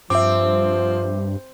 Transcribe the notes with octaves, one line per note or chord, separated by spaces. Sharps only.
G2 F3 C4 E5 D6